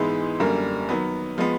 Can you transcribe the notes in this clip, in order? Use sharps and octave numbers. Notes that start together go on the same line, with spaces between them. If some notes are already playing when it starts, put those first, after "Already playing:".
Already playing: G#2 E3 G#3 B3 E4
F#2 D3 G3 A#3
D#3 F#3 B3
F3 G#3 B3